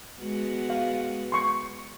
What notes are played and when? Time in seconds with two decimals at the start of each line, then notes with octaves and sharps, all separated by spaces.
0.19 G#3 B3 F#4
0.70 F5
1.32 C6 C#6